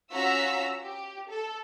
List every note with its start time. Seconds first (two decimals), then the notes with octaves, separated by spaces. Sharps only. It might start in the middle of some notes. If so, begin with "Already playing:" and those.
0.13 C#4 F4 F#4 A#5 E6 B6
0.82 G4
1.29 A4